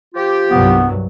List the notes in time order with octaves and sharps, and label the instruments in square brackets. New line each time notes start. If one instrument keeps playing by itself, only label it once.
[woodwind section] F3 F4 G4
[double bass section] C2 G2 F#3 [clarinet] B3